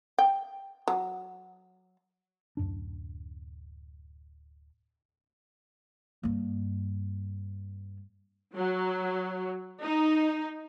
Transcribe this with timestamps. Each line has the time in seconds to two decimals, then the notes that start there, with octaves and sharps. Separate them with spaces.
0.18 G5
0.88 F#3
2.57 D1 F#2 D4
6.23 G2 A#3
8.56 F#3
9.82 D#4